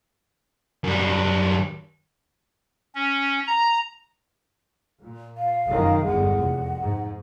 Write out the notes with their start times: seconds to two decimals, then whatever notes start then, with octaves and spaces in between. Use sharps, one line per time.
0.84 F#2 G3
2.95 C#4
3.47 A#5
5.03 A#2
5.37 F5
5.68 F1 F#2 D#3
6.05 G1 E2 G#3 F#5
6.41 F1
6.81 G#2